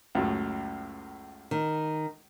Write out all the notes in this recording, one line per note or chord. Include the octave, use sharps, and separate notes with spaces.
C#2 F#2 A2
D#3